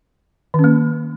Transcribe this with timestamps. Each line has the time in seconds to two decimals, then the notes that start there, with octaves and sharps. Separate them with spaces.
0.54 D#3
0.59 C#4
0.64 A#3